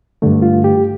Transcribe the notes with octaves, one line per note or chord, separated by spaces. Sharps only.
G2 D3 A3
F4
G4